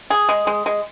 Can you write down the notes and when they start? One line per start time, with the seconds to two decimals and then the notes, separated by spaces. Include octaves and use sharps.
0.10 G#4
0.29 G#3
0.47 G#3
0.66 G#3